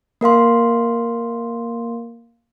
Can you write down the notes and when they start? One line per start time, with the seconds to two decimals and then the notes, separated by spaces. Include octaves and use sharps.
0.21 A#3 A#4 F5 C6